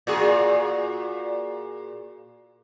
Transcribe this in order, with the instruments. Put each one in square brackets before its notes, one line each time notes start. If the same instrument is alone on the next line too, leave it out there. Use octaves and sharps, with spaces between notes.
[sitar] A#2 F#4 G#4